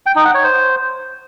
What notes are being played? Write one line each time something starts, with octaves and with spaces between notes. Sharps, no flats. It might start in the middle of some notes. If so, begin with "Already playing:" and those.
G5
D#4
F#5
C#5
C5